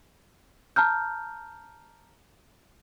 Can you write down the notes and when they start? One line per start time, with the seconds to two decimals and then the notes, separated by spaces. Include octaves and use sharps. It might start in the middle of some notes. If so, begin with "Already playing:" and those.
0.76 A5 A#5 F6 G6